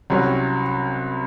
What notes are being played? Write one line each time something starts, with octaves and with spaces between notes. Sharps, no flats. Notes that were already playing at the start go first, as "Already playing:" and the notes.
C2 C3 F#3 C#4 F#4